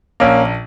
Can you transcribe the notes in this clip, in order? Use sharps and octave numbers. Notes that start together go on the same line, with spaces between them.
A#1 A#3 C#4